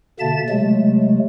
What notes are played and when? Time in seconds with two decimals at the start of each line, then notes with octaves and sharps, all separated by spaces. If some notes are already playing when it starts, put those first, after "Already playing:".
0.20 B2 D3 A#3 E5 A5 A6
0.49 C3 F#3 G#3 A3